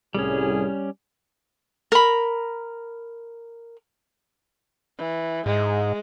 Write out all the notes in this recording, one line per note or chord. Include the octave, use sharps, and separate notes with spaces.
C2 A2 G3 C#4 G#4
A#4 B5
E3
G#2 G#3